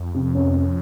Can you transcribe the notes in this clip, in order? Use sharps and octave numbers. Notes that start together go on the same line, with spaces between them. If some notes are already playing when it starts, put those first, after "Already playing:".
Already playing: F2
C3
C#4
C#4